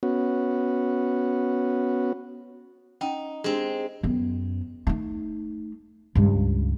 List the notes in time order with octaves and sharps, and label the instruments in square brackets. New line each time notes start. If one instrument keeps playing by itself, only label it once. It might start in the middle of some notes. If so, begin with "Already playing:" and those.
[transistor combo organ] B3 C#4 F#4
[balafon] C#4 F#5 G5 [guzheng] D#4
[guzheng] G#3 C4 [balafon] D4 G4 G#4
[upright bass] F#2 B3
A3 D#4
C#2 G2